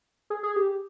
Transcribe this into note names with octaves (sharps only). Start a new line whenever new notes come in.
G#4
G#4
G4